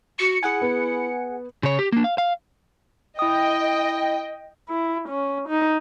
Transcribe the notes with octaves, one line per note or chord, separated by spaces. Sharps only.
F#4 C#7
E4 G#4 F#5 G#5
B3
C#3 C#5
G4
A#3 D4
F5
F5
E4 D#5 G5 D#6
E4
C#4
D#4